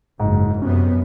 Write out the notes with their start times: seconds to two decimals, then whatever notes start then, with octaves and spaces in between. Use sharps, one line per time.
0.20 F#1 G#2
0.62 F#2 C3 B3 C#4